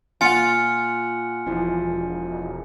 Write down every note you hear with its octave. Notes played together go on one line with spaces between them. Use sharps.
A#2 F4 F#5 G#5 C#7
E1 E3 F3